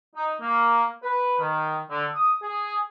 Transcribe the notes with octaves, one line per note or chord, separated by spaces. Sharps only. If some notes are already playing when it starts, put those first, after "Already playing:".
D#4
A#3
B4
D#3
D3
D#6
G#4